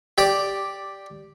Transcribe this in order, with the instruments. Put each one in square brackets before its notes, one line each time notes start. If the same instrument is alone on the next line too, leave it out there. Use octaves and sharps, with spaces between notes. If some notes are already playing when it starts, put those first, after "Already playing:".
[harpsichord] G4 D5